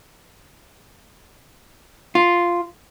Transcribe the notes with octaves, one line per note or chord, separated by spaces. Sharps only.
F4